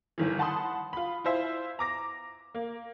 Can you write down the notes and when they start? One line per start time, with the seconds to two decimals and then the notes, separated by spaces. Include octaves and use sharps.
0.18 G1 D#3 E3
0.39 F#5 A5 B5 C6 D#6
0.93 F4 B5
1.24 E4 F4 C5 E5
1.79 A#5 D6 A#6
2.55 A#3